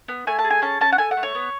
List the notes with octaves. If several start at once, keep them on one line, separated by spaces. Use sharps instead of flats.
B3
A3 G#5
A5
G#4
G#5
C#4 A5
C#4 A5
F#5
A3 G#5
F#5
A3
C#5
B3